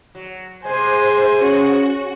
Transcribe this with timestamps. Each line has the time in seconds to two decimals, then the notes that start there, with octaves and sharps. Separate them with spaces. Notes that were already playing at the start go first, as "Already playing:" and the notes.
0.15 F#3
0.65 C3 G#3 C5 G#5
1.42 C#4 F#4